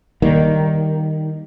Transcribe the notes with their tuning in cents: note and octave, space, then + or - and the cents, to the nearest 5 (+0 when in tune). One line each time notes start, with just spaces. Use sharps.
D#3 +0 G3 +0 A#3 +0